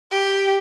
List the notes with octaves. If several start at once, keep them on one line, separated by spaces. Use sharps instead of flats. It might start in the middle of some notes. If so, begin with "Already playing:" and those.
G4